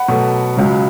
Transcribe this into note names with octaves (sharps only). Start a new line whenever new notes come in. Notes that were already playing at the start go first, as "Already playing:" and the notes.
Already playing: F#5 B5
B2 F#3 A3
C#2 C#3 F#3